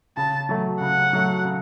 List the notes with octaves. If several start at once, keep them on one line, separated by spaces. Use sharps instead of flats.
C#3 A5
F#3 A3
C#3 F#5
F#3 A3
C#3